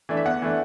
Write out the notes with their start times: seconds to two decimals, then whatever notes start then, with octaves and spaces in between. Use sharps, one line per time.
0.09 E3 A3 D4
0.17 E5
0.25 E2 F#5
0.42 E3 A3 D4